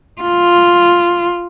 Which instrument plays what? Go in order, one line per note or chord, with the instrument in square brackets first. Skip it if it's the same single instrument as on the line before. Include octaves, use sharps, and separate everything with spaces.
[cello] F4